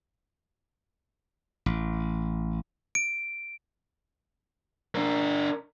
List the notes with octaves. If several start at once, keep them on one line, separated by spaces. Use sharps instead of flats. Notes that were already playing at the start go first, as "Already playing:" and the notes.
A1
D7
D4 A#4